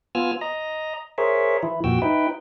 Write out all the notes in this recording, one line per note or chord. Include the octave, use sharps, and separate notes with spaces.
B3 F4 G#5 E6 F6
D#5 A#5
G#4 A#4 C5 C#5 E5
E3 E4
F2 A#2 F#4 G5 E6
D#4 E4 B4 G5